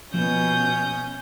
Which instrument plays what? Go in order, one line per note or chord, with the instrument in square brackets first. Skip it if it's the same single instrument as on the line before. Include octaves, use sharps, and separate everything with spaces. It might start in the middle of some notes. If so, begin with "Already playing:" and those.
[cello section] B2 [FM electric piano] F3 [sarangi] C#4 [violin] D#6 G6